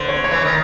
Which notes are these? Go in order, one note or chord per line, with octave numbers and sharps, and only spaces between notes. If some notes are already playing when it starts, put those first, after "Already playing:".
Already playing: D3 B4 C5
C#5
C#5
E3
D#3